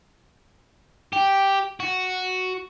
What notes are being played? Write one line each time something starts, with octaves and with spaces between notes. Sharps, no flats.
G4
F#4